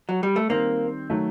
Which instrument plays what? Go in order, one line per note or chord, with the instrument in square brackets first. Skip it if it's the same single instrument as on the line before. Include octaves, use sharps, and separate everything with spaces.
[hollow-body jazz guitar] F#3
G3
A3
[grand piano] D#3 G3 C4 [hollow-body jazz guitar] A#3
[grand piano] D#3 F#3 A3